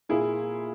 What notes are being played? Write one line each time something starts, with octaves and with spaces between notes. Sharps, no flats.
A#2 A#3 E4 G#4